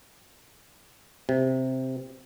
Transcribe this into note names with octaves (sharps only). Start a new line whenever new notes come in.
C3